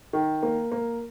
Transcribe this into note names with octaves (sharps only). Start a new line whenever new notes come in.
D#3
A#3
A#3